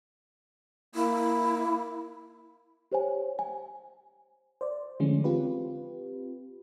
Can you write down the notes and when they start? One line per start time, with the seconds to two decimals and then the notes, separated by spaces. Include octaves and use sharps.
0.95 A#3 E4
2.92 G4 C5 C#5 G#5
3.39 G#5
4.61 C5 D5
5.00 D3 E3 F3 G#3 A3 C#4
5.24 C4 F4 G4 B4